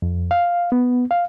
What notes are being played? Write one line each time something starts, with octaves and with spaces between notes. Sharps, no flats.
F2
F5
B3
F5